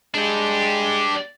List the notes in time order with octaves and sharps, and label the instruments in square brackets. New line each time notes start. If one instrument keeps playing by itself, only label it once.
[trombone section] G#3 [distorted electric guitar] D4 G4